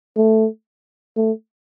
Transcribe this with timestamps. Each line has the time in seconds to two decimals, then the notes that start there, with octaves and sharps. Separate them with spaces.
0.17 A3
1.17 A3